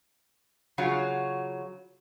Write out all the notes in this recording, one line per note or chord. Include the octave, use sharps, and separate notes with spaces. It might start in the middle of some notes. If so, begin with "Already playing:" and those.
C#3 F#3 F4